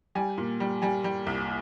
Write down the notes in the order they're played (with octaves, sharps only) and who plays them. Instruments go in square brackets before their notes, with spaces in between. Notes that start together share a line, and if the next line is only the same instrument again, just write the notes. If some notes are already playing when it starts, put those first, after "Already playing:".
[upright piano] G3 G#5
A#2
G3
G3 G#5
G3
C2